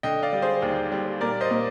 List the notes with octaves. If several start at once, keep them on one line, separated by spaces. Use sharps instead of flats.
D3 D#5 G5
D5 F5
G3
G#4 C5
D#2
G3
A#2 A#4 D5
C5 D#5
A#2